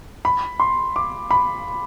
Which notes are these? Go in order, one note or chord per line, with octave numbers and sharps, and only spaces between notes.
B5
C6
D6
B5